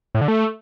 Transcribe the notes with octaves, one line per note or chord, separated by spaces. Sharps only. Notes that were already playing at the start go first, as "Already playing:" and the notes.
A2
D3
A3